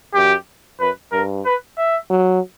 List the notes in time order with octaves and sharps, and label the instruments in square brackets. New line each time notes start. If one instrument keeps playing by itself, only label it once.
[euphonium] F#2 [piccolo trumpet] G4
[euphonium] F#2 [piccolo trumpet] B4
[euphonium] G2 [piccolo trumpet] A#4
[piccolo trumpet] B4
E5
[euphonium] F#3